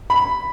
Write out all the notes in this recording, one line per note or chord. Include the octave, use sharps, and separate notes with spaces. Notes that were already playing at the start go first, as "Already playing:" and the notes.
B5